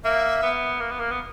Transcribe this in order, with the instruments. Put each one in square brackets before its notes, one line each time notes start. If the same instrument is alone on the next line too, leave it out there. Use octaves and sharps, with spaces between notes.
[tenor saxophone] A#3 [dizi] E5
[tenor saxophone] B3
A#3
B3
A#3
B3